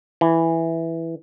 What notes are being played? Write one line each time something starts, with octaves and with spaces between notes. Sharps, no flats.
E3